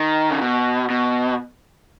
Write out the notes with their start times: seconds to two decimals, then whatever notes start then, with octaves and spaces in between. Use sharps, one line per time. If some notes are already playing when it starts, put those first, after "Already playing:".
Already playing: D#3
0.30 C#3
0.41 B2
0.90 B2